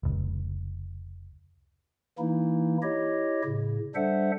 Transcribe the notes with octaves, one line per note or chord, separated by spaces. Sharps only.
F1 C#2
E3 A#3 D#4 E4
E4 G4 C#5 D#5
A2 C#3
G3 D4 A4 C5 E5 F#5